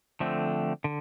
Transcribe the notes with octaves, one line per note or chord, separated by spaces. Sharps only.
D3 F3 A3 C4
D3